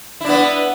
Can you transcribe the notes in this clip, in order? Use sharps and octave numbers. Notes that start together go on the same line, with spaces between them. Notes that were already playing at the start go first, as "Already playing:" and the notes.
B3 D4 E4